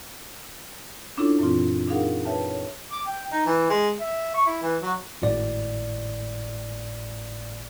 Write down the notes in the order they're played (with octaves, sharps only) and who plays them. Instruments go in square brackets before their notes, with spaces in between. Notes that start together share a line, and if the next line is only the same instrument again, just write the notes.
[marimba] C#4 D4 E4 F4 A4 C#5
F#2 A#2 E3 C4 F4
D4 D#4 G#4 A#4 F5 F#5
B4 C#5 E5 G5 A5
C#5
[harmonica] D6
G5
D#4
E3
G#3
E5
C#6
E4
E3
F#3
[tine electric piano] G#1 A2 D5